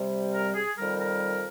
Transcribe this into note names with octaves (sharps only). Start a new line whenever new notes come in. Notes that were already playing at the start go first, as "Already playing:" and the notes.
Already playing: C3 G3
A#4
G#4
F2 D#3 G3 A#4
A#4